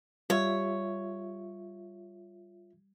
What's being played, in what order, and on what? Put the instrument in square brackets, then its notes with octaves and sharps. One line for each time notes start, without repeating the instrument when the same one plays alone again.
[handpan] G3 [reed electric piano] F4 E5 [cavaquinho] C#5